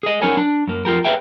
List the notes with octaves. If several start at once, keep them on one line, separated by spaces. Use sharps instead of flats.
G#4 D#5
F#3 C#4 D#4 A#4 C#5 G#5
D4
F#2 A#3
F2 F4 G4 A#4
G#4 B4 C#5 E5 F5 G5